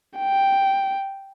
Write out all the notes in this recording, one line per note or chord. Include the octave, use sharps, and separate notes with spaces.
G5